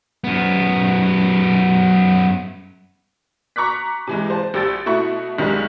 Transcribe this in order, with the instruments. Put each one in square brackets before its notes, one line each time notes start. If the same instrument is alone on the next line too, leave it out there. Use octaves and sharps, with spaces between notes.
[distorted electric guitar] F#2 B3
[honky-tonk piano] A#5 C#6 D6 F#6 B6
C3 E3 G#3
C5 A5
A#1 G3 G4 E6 A6 D7
B2 A3 E4 F#4 C#6
B1 D#3 G3 G#3